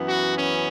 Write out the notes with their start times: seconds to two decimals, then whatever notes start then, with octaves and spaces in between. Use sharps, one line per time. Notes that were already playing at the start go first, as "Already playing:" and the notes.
Already playing: F#2 E3 B3
0.09 F#4
0.38 C#4